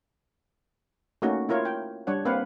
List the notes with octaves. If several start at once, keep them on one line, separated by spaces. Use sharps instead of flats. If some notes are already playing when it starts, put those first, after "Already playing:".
A3 A#3 C#4 D#4 F#4
E4 F4 A#4 C#5
G5
G3 D4 C#5 F#5
A#3 C4 B4 F5 F#5